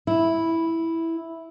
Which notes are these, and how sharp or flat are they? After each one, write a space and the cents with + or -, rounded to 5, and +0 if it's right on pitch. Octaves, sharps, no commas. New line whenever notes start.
E4 -5